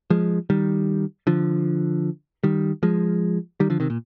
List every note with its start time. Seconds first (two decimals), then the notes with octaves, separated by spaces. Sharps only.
0.10 F3 G#3
0.50 D#3 G3
1.27 D3 F3
2.43 D#3 G3
2.83 F3 G#3
3.60 D#3 G3
3.70 D3 F3
3.80 C3 D#3
3.90 A#2